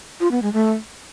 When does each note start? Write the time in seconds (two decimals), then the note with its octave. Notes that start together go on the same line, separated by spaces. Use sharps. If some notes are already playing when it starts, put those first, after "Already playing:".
0.20 F4
0.31 B3
0.42 G#3
0.53 A3